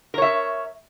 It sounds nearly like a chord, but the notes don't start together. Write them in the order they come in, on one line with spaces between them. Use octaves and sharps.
A#4 C#5 E5